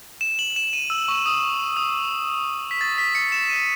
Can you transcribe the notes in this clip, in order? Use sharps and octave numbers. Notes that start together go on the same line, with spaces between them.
E7
F#7
E7
D#7
E6
C#6
D#6
D#6
B6
A6
B6
C#7
E7
D#7